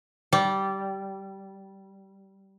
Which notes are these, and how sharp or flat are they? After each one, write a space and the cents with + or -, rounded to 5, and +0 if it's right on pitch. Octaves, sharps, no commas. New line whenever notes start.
G3 -15